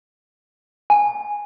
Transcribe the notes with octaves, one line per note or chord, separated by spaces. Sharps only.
G#5